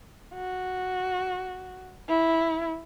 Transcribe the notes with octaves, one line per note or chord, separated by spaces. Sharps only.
F#4
E4